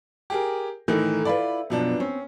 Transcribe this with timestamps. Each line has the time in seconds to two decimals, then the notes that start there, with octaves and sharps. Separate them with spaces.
0.30 G4 G#4 A#4
0.88 A2 D#3 E3 D#4 A4 A#4
1.25 E4 F4 B4 D5 B5
1.70 F#2 B2 F3 B3 D4
2.00 C4 C#4